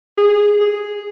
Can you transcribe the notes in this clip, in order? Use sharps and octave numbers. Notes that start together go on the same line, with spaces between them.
G#4
G#4